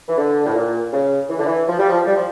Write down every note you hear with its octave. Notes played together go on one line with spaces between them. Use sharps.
E3
D3
A2
A#2
C#3
E3
D3
E3
F3
G3
F3
G3
F3